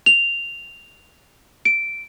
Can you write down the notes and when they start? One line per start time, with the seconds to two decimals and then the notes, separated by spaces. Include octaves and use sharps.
0.06 F7
1.65 D7